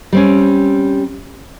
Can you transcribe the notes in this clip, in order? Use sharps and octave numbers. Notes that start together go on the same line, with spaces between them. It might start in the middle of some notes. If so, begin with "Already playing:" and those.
G3 C4 C#4